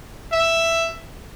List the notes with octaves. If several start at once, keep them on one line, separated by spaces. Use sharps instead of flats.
E5